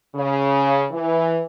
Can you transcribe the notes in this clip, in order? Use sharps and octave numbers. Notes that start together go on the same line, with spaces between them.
C#3
E3